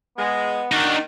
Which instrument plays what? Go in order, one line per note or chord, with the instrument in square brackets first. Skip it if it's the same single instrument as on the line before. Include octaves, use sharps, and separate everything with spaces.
[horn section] G#3 [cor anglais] B3
[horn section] D#3 [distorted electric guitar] D4 D#4 [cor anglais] F#4